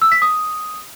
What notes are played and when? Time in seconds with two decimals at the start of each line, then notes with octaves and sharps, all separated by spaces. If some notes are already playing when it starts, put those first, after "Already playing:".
0.02 E6
0.12 B6
0.22 D#6